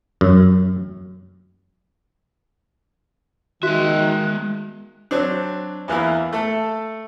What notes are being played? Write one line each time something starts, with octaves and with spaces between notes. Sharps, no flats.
F#2
D#3 G#3 F#4 E5 F#6
F#3 C4 D4
E2 E3 A#3 E4
A3 A4